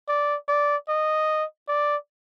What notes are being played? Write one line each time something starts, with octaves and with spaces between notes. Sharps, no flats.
D5
D5
D#5
D5